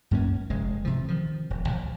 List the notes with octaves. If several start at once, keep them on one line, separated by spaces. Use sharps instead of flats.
F#2 A#3 C#4
F1 G#3
C3 E3 F3
D#3 F3
E1
A#1